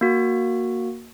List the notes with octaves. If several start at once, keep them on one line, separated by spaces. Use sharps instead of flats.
A#3 F#4